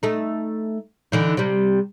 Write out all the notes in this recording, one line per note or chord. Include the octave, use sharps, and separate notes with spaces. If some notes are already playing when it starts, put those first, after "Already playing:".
A3 D#4
D3 E3 D#4
C3 G3